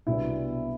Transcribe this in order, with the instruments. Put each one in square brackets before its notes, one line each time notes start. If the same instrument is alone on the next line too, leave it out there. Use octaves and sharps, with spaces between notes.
[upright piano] C2 B2 F#3 B3 D4 E4